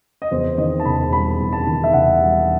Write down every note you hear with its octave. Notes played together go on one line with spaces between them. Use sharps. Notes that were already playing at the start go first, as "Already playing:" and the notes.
D#5
E2 C5
D#3 D#5
A5
E1 B5
G3 B5
E2
A5
D#3
E5
E1 F#5
G3